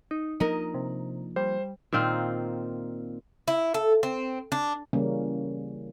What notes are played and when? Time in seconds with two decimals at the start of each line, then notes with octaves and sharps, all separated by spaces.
0.11 D#4
0.40 F3 A#3 D4 D#4 A#4 D#5
0.74 C3
1.36 G3 C5
1.93 A#2 D#3 C4 F4
3.48 E4
3.74 A4
4.03 C4
4.52 D4
4.93 C#3 E3 G3 A#3 C#4